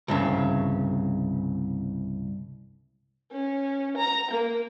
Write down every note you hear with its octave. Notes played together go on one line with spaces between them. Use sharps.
C2 G2 C#3
C#4
A#5
A#3